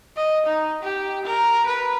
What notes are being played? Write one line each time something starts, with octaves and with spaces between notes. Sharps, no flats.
D#5
D#4
G4
A#4
B4